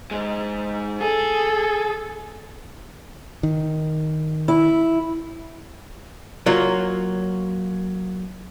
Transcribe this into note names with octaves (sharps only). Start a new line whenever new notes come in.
G#2 G#3
G#4 A4
D#3
E4
F#3 A#3 F4